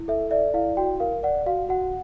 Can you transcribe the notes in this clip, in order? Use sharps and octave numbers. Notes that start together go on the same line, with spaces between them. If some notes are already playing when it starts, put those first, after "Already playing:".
Already playing: E4
A4 E5
D5 E5
E4 F5
F#4 G5
A#4 F5
D5 F#5
F#4 F5
F#4 F#5